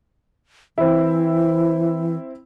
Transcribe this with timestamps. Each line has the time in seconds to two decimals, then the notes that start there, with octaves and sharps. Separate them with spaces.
0.78 E3 C4 E4